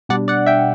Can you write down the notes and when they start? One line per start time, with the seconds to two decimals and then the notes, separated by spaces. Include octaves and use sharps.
0.09 B2 G3 D4 D5 F#5
0.28 D5 F#5
0.46 E5 G5